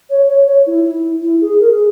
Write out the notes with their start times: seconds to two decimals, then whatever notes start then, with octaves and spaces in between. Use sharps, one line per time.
0.10 C#5
0.29 C#5
0.47 C#5
0.66 E4
0.85 E4
1.22 E4
1.41 G#4
1.60 A#4
1.70 G#4